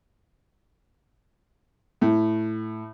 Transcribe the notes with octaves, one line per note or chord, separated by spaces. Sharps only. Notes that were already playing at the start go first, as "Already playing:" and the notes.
A2